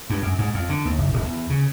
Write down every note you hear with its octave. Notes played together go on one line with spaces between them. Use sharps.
G2
F#2
G#2
F2
D3
D#2
F#1
D1
E2
C#3